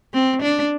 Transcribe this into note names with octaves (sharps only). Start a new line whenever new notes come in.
C4
D4